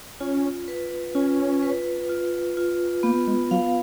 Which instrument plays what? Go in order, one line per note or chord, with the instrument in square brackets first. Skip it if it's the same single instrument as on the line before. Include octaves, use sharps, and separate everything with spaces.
[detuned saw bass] C#4 [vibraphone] F4
[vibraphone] B4
[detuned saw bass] C#4 [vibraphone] F4
[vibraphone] B4
F4
F4
[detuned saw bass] A#3 [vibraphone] B3
[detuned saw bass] G#3
[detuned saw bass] F#3 [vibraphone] F5